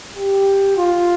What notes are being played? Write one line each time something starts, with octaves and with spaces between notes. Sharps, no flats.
G4
F4